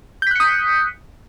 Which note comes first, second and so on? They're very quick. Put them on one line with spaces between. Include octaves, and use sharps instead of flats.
G6 B6 F#6 C#7 D#6